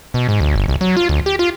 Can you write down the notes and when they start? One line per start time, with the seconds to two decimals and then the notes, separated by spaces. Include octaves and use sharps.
0.14 B2
0.29 G#2
0.40 D2
0.55 G1
0.68 C2
0.81 F#3
0.97 F4
1.09 D2
1.26 G4
1.39 F4